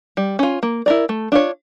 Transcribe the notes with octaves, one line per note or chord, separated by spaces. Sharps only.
G3
C#4 F4
A#3
E4 A#4 D5
A3
D4 F4 C#5